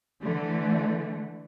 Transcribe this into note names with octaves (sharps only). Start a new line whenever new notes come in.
D3 E3 A3